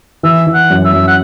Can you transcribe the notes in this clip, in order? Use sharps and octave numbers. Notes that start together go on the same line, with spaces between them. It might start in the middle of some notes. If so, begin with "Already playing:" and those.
E3 E5
E3
F#5
F#2
E5
F#2
F#5